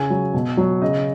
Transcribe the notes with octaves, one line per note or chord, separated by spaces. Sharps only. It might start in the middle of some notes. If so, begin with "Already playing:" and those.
Already playing: C#3 G#5
F#3
B2
F#3
C#3 D#5